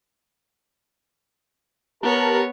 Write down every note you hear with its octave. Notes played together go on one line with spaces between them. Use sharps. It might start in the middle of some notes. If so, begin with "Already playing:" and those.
B3 G4 A#4 C#5 A5